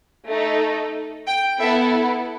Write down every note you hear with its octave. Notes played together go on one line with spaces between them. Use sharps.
A3 D#4 A4
G5
B3 E4 A4 E5